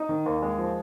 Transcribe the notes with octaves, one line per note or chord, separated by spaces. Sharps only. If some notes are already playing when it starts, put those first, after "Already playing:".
Already playing: D#4
D#3
D#2
G#3
F3